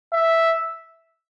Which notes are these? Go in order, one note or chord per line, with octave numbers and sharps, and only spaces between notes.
E5